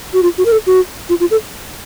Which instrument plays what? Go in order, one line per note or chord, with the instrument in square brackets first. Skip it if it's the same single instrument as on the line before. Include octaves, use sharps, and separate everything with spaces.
[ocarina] F#4
F4
F#4
A#4
A4
F#4
F4
F4
A4